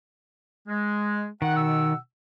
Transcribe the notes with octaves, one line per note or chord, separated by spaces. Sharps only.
G#3
D#3 F#5
B2 F#5 E6